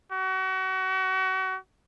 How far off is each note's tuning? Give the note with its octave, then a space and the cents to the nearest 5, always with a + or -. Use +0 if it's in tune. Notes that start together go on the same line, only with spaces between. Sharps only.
F#4 +35